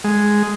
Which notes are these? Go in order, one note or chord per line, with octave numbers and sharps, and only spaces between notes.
G#3